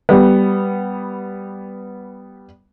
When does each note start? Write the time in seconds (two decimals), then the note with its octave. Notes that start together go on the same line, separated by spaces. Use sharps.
0.09 G3 B3